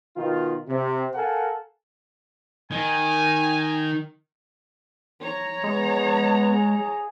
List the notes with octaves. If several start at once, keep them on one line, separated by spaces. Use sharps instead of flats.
B2 D#3 F4
C3
A4 A#4 F5 F#5 G#5
D#3 G#5
C#5 A#5
G#3 B3
G#4